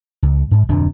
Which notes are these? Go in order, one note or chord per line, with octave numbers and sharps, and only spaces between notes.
C#2
G#2
D1 F2 B2 D4